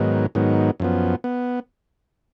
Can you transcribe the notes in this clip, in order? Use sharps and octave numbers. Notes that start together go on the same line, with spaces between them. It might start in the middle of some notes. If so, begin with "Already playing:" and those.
Already playing: G#2 D#3 F#3 B3
G#2 D#3 F#3 B3
F#2 F3 B3
B3